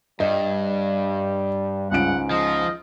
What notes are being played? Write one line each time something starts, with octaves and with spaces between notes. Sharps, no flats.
G2 G3 D#5
C#2 G#2 C#4 F#5 D7
F3 D#5